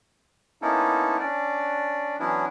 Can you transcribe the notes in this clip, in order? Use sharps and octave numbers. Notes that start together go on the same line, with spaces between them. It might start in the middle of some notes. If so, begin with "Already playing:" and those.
A#3 B3 C#4 D#4 E4 A4
C#4 D4 D5
E3 F#3 B3 C#4 D4 E4